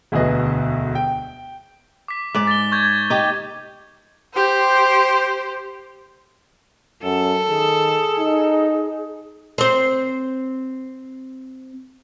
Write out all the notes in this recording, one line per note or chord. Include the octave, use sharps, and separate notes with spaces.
E1 D2 G#4 B4 D#5
G5
D6 B6
G#2 D5
A6 G7
C#6 G6 G#6
D#4 G4
G4 C5
F#2 A4
D#3 G#4
D#4
C4 C5